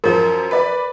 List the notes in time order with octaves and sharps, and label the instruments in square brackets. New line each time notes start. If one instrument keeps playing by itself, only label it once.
[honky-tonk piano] F#2 F3 [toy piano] A#4
[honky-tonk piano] B4 D5